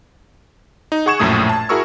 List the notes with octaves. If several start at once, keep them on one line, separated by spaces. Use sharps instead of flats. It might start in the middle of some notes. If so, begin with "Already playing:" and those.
D#4
G#4 F#5 C#6 G#6 E7
A#1 F#2 A2 A3 D#6
A5
E4 F#4 G#4 A#4 C#6 E6